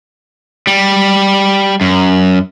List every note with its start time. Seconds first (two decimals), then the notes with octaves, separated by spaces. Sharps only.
0.67 G3
1.81 F#2